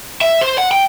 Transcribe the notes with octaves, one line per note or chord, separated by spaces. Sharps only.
E5
C5
F#5
G5